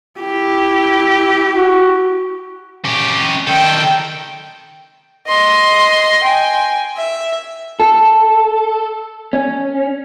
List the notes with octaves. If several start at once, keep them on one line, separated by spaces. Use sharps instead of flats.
E4 G4
F#4
C#4 G4
D#3 A4 G5
D#5 C6
G5 G#5
E5
A4
C#4